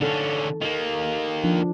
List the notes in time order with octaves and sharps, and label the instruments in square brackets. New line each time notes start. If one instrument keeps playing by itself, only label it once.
[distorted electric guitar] D3 C#4 [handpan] D#4 A4
[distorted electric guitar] D#3 A#3
[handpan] F3 D4